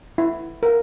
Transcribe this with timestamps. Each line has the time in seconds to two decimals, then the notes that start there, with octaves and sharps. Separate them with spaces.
0.18 E4
0.63 A#4